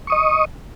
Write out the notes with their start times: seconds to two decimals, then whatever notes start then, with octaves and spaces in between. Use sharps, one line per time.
0.07 C#6
0.10 D#6
0.12 D#5